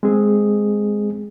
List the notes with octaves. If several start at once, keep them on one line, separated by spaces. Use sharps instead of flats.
G#3 C4 G#4